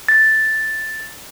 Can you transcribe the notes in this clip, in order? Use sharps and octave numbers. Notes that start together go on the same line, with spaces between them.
A6